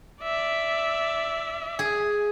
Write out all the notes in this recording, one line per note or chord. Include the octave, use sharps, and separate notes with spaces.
D5 E5
G#4